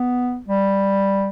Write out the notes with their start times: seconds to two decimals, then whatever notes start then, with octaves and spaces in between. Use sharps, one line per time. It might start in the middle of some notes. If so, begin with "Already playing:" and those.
Already playing: B3
0.48 G3